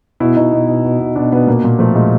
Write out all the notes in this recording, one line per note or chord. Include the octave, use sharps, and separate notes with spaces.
B2 E4
B2 D#4
B2
B2
B2
B2
B2 D4
B2 B3
A#2 A#3
A#2
F3 A3
A#2 G#3